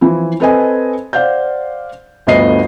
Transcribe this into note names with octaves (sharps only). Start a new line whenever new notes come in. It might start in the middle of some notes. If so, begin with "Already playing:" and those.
E3 F3 E4
C4 A4 B4 D#5 G#5
C5 D5 F5 F#5 G6
G1 D2 B3 D#5 C7